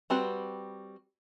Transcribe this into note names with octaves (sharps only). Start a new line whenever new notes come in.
G3 C4 F#4 B4